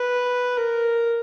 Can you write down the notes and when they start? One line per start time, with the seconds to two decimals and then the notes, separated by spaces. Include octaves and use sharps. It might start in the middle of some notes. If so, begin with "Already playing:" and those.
Already playing: B4
0.57 A#4